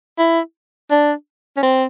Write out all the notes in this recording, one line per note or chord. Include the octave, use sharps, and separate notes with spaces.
E4
D4
C#4
C4